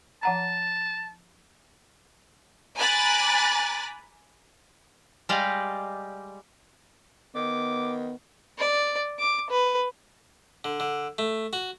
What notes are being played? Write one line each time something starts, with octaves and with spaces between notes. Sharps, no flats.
F3 F#5 A5 A#5
G#5 A#5 B5 D6 F#6 A6
G3 G#3 G4 D5 D#5 F5
D#3 B3 D6
D5
D6
B4
D3
D3
A3
F#4